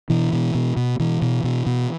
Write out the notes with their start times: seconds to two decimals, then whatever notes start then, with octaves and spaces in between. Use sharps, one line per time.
0.10 B2 E3
0.33 B2
0.55 B2
0.77 B2
0.99 B2 E3
1.22 B2
1.44 B2
1.66 B2